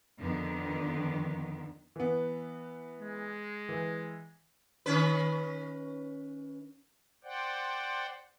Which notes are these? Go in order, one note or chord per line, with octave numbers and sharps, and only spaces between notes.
F2 D3 D#3 B3
E3 B3
G#3
E3
D#3 C#4 B4
C5 D5 F#5 G5